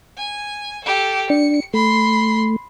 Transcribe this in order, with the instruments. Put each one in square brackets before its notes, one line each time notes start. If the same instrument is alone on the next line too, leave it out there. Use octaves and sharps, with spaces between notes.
[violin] G#5
G4 A4
[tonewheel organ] D4 [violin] C#7
[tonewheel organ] A3 [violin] B5 C6